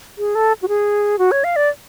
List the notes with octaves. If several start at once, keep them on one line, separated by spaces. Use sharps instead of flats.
G#4
A4
F#4
G#4
F#4
C#5
F5
D5